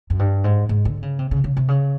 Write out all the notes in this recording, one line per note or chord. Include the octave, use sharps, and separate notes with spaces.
F#2
G2
G#2
G#2
D3
C#3
C3
C#3
C#3
C3
C#3